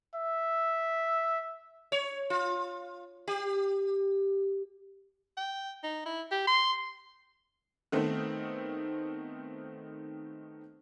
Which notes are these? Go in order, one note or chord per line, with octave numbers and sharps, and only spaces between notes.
E5
C#5
F4
G4
G5
D#4
E4
G4
C6
D#3 A3 B3 C4